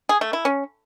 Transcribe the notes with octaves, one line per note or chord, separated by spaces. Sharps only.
G#4
A3
E4
C#4